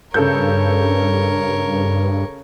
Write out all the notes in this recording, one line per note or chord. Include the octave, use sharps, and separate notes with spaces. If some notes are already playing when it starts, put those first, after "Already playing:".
G2 C#3 A4 A#4 C#5 G6